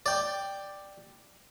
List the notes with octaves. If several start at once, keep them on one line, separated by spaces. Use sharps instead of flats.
D5 G5